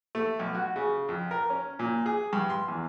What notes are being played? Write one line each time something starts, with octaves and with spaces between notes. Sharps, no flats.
A3
B1
F#4
C#3
F2
A#4
C#4
A#2
G#4
G2
C6
E2